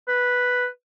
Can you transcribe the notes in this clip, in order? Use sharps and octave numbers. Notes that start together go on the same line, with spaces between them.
B4